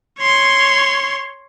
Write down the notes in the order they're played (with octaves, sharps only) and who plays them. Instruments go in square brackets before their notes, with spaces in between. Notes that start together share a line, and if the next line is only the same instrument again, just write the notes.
[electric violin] C#5 C6